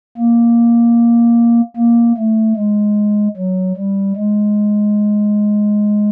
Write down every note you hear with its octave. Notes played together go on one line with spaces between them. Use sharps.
A#3
A#3
A3
G#3
F#3
G3
G#3